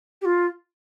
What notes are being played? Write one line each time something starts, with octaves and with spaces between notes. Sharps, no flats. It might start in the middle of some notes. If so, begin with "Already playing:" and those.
G4
F4